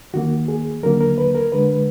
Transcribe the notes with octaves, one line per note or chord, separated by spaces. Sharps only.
D#2 D#3 A#3 F#4
G#4
D#2 D3 F#3 A#3 A#4
A#4
B4
A#4
D2 D3 G#3 B4